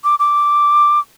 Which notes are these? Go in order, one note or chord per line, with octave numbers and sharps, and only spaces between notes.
D6
D6